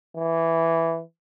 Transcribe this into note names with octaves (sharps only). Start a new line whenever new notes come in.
E3